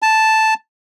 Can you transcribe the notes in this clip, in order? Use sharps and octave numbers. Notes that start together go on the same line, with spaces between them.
A5